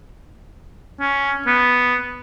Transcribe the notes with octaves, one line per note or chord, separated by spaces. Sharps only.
C#4
B3